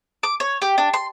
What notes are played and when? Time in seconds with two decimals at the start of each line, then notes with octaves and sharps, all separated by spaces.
0.23 D6
0.40 C#5
0.62 G4
0.78 D4
0.94 C6